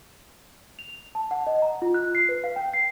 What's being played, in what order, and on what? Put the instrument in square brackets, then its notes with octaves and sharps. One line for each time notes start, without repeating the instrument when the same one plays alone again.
[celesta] F7
A5
F#5
D#5
A#5
F4
F#6
C7
B4
F5
G5
C7